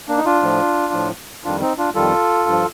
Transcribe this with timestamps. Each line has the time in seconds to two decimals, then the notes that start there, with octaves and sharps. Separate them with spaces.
0.08 A#3 D4
0.17 D#4
0.25 D4 F4
0.42 A2 F3
0.93 A2 F3
1.44 F2 D#3 G3 D4 F4
1.61 C4 D#4
1.78 D4 F4
1.95 F2 D#3 G3 F4 A4
2.46 G2 F3